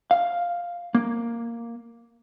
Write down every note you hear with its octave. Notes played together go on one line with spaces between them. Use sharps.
F5
A#3